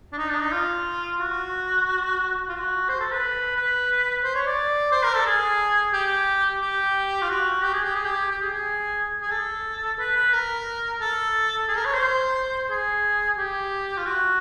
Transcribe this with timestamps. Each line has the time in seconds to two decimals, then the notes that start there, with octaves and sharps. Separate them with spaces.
0.13 D4
0.18 D#4
0.30 D4
0.41 D#4
0.52 F4
1.20 F#4
2.49 F4
2.55 F#4
2.89 C5
3.00 A4
3.12 B4
3.56 B4
4.24 C5
4.35 C#5
4.46 D5
4.91 C5
5.03 A#4
5.15 A4
5.26 G#4
5.93 G4
6.62 G4
7.22 F4
7.29 F#4
7.63 G4
7.73 G#4
7.84 G4
7.95 G#4
8.05 G4
8.31 G4
8.41 G#4
8.53 G#4
9.22 G#4
9.31 A4
9.99 B4
10.16 B4
10.34 A#4
11.01 A4
11.68 G#4
11.77 A#4
11.86 C#5
11.94 C5
12.70 G#4
13.38 G4
13.98 F4
14.06 F#4